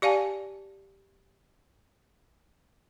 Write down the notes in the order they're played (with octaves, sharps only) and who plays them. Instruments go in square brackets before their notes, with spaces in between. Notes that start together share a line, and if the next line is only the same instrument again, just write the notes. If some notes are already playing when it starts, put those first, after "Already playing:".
[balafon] G4 D5 F5 G#5 A5